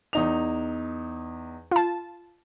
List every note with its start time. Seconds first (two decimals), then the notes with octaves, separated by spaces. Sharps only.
0.13 E2 D#4 F7
1.71 F4 A5